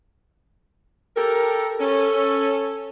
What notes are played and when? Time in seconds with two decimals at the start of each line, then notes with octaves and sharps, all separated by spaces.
1.17 G4 A4 A#4
1.80 C#4 A4